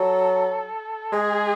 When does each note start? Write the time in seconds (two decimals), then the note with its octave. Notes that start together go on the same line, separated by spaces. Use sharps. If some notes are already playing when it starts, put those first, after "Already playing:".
Already playing: F#3 A4
1.12 G#3 G#4